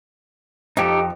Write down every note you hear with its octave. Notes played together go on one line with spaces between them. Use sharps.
F2 D#4 G4 A4